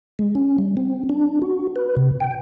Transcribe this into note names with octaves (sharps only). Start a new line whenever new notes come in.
G#3
C#4
G3
C4
D4
F#4
B4
C3
G5